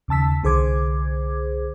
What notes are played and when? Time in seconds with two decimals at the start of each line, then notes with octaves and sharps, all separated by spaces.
0.08 D#2 C#3 A5 E6 B6
0.43 C2 D3 G#4 C5 D6 G#6